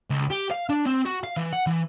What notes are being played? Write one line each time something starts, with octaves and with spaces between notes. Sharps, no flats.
C#2
G4
F5
D4
C4
F#4
F5
E3
F#5
E3